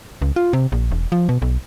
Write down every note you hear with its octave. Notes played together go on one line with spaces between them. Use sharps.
C#2
F4
C3
A#1
E1
F3
B2
B1